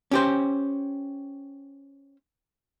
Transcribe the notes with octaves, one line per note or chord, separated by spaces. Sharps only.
C#4 G4 C5